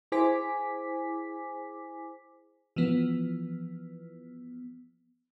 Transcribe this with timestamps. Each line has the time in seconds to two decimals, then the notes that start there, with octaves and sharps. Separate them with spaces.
0.12 E4 G#4 C5 G#5 D6 B6
2.76 E3 F3 B3